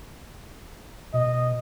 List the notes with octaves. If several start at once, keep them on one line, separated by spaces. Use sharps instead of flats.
B2 D#5